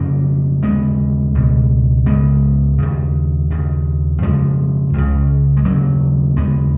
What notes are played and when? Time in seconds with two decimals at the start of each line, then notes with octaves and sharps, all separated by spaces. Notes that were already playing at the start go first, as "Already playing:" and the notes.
Already playing: F2 C#3 A#3 C#4
0.63 D#2 C#3 G#3 B3
1.35 C#2 B2
2.06 C#2 C#3 G#3 B3
2.78 D#2 C#3
3.50 D#2 C#3
4.22 F2 C#3 F3 G#3
4.93 C#2 C#3
5.57 G#3
5.65 D#2 C#3 F#3 A#3
6.37 D#2 C#3 G#3 B3